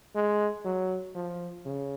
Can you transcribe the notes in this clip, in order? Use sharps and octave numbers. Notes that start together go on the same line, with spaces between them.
G#3
F#3
F3
C#3